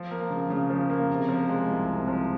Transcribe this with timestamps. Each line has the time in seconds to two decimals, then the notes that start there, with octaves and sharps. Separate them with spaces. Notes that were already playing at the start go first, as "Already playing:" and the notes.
Already playing: F3
0.11 A#3
0.30 C#3
0.50 C#3
0.70 F3
0.90 A#3
1.10 C3
1.29 F3
1.49 G#3
1.69 C2
1.88 C3
2.08 F3